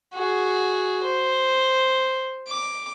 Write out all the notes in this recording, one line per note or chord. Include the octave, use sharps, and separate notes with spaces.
F#4 G#4
C5
D6